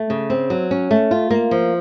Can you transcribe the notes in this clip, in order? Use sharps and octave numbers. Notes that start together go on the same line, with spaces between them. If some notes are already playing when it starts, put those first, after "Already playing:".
Already playing: A3
C#3
C4
F#3
C#4
A3
F4
A#3
F3